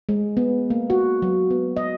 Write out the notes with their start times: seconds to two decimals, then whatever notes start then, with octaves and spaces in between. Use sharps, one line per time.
0.09 G#3
0.37 B3
0.70 A#3
0.90 F#4
1.22 F#3
1.51 B3
1.77 D#5